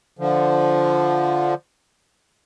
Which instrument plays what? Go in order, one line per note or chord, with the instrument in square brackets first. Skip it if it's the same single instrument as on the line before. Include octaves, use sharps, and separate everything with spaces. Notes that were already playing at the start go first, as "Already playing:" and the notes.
[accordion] D3 F3